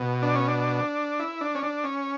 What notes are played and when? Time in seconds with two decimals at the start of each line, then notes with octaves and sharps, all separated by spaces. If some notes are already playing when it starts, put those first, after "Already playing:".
Already playing: B2
0.22 D4
0.35 C#4
0.48 D4
1.19 E4
1.41 D4
1.55 C#4
1.62 D4
1.84 C#4